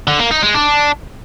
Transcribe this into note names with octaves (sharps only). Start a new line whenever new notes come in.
D3
A#3
D#4
G#3
D4